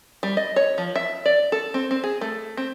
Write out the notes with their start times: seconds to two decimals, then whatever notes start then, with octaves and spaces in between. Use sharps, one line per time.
0.23 G3
0.37 D#5
0.56 C#5
0.78 F3
0.96 E5
1.26 D5
1.52 A4
1.74 C4
1.91 C4
2.04 G#4
2.21 A3
2.57 C4